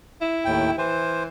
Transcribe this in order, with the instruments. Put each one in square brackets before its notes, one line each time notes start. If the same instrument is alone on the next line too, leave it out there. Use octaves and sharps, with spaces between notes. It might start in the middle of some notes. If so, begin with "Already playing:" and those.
[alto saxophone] E4
[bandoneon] D#2 A2 G5
[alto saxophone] E3 [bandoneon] C5